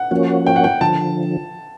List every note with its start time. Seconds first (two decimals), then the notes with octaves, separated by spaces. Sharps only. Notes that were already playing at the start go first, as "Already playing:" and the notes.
Already playing: F#5
0.11 F3 A#3 C#4 F#4
0.47 G5
0.56 F#5
0.64 G5
0.81 D3 F3 A5